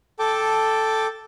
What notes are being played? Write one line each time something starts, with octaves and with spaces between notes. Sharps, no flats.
A4 G5 A5 D6